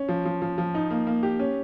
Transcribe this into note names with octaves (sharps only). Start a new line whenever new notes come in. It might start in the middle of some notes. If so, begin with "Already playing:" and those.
Already playing: C#4
F3
F3
F3
F3
D#4
A#3
A#3
G4
C#4